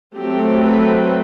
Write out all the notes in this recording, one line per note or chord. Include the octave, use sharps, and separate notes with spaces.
F#3 A3 C4 G4
B4